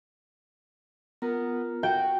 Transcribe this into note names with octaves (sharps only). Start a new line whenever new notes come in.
B3 F4 A#4 A#5
F#4 G5